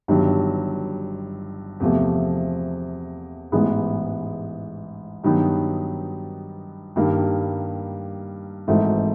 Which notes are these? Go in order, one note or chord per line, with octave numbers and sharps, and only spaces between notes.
G1 G2 D#3 F#3
E2 C3 F3 A3
A1 G#2 E3 G#3 B3
G2 D#3 F#3 B3 D#4
G2 D#3 G3 A#3
G#1 G#2 E3 A3